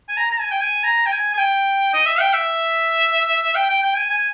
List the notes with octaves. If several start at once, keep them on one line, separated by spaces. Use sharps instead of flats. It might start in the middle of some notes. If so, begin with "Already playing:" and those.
G#5
A#5
A#5
G#5
G5
G#5
A#5
G5
G#5
G#5
G5
D#5
E5
G5
E5
G5
G5
G5
G#5
G#5